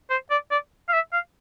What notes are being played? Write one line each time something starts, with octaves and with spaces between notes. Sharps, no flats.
C5
D5
D5
F5
E5
F5